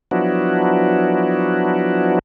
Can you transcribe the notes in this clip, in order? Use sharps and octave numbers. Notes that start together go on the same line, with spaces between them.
F3 F#3 B3 D4 E4 F#4